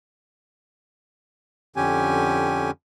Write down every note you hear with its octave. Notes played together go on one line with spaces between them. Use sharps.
F2 D3 C#4 G4 G#5